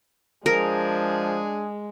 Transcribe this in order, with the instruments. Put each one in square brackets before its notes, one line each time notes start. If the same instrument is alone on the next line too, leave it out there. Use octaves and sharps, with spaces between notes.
[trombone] F3 [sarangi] G#3 [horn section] D4 G#4 [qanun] A#4